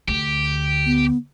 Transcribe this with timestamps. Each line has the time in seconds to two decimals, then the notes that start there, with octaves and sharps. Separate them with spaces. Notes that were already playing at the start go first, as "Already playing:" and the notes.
0.08 D2 G4
0.86 B3